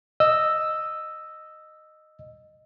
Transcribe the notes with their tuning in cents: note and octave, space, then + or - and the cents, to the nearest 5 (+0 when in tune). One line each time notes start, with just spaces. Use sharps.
D#5 -10 E6 +0